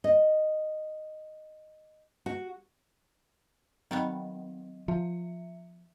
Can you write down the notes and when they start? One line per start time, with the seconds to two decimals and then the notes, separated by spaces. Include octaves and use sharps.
0.04 D#5
2.26 F#4
3.91 D#3 F#3 G3 B3
4.88 F3 E5